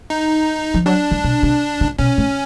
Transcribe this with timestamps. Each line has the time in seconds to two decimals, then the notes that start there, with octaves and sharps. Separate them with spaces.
0.10 D#4
0.74 F3
0.86 F#3 D4
1.11 E3
1.24 B2
1.43 C3
1.81 C#3
1.99 B2 C#4
2.18 A2